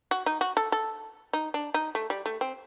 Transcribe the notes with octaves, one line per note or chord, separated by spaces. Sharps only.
F#4
D#4
F#4
A4
A4
D#4
D4
D#4
A3
G3
A3
C4